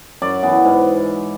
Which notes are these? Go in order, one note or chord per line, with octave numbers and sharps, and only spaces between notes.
F#2 D5
E3 B3
G#2